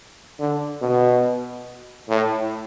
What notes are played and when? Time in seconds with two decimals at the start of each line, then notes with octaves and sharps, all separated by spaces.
0.39 D3
0.82 B2
2.09 A2